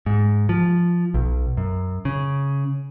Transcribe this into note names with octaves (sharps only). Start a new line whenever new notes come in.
G#2
F3
B1
F#2
C#3